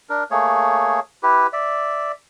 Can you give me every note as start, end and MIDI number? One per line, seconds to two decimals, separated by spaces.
0.10 0.24 62
0.10 0.24 70
0.31 1.00 57
0.31 1.00 58
0.31 1.00 68
0.31 1.00 73
1.23 1.47 64
1.23 1.47 67
1.23 1.47 71
1.53 2.12 74
1.53 2.12 76